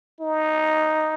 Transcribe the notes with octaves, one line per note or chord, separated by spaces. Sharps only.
D#4